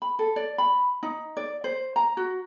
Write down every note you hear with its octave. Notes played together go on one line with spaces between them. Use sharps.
B5
A4
D5
B5
D#4
D5
C5
A#5
F#4